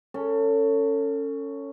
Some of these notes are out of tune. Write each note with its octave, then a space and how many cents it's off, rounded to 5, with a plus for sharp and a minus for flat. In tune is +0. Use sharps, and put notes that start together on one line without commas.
C#4 +0 A4 +30